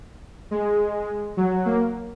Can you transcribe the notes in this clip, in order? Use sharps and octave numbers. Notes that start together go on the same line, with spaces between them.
G#3
F#3
A#3